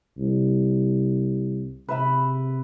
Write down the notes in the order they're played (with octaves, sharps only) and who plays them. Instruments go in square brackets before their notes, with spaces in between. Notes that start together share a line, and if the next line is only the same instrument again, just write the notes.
[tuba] C2
[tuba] C3 [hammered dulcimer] B4 E5 B5